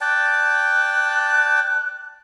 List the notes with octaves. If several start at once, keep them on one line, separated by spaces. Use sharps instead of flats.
D5 G5 A5 F#6